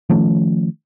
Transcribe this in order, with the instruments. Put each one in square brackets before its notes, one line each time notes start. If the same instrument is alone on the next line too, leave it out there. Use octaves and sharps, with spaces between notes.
[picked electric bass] D#3 F3 A3 C#4